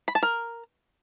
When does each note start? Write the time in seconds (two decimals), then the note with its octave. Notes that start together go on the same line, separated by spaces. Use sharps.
0.08 B5
0.15 A5
0.23 A#4